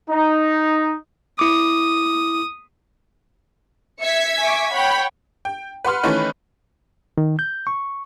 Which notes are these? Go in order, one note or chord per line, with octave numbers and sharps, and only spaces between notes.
D#4
E4 D6 D#6
E5 G#6 B6 C#7
G#5 C#6 D6
C#5 F#5 G5 B5
G5
B4 F#5 C6 F6
D#3 E3 A3 C#4 D#4 B4
D#3
G6
C#6